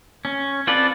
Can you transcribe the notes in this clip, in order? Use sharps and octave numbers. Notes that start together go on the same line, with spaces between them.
C#4
C4 F4 A4 B4 D5